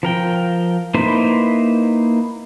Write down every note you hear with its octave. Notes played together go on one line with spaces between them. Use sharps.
F3 A#4 G5
A#3 D#4 E4 B4 C5